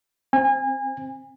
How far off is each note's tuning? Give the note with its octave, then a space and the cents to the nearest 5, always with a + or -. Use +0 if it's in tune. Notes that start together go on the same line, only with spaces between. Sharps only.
C4 +10 G#5 -30